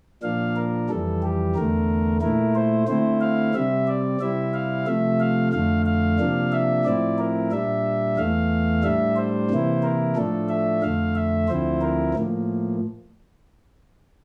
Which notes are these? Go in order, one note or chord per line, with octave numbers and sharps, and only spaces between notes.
A#2 F3 A#3 D4 F5
A#4
F2 E3 G3 A4
G4
E2 D3 A3 A#4
A#2 A3 E4 A#4
C5
D3 A3 C4 E4 C5
F5
C3 G3 C4 E5
D5
C3 G3 C4 E4 E5
F5
C3 F3 A3 E5
F5
F2 D3 A3 F5
F5
C3 F3 A#3 D4
E5
A2 F3 C4 E4 D5
A#4
A#2 G3 D4 E5
E2 E3 A3 F5
A2 G3 D4 E5
C5
C3 E3 A#3 E4
A#4
A2 F3 A3 D4 A4
E5
F2 D3 A3 F5
E5
D2 D3 F3 C4 E4 C5
A#4
A2 F3 A#3